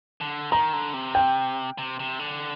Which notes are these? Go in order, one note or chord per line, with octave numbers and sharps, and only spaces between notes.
D3
D#3 A#5
D3
C3
G5
C3
C3
D3